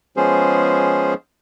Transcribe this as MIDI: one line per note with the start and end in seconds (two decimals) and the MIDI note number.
0.17 1.14 53
0.17 1.14 56
0.17 1.14 59
0.17 1.14 61
0.17 1.14 68
0.17 1.14 72